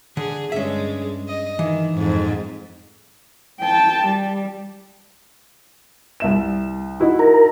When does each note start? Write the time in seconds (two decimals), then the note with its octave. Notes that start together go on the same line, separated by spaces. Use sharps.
0.17 D3 G#4
0.52 G2 G#3 C#4 E5
1.28 D#5
1.59 D#3 E3
1.94 F2 G#2
3.60 G5 A5
4.06 G3
6.20 C2 E5 E7
7.00 D#4 E4 F#4
7.19 A#4